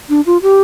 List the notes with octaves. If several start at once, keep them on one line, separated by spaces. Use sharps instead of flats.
D4
F4
G4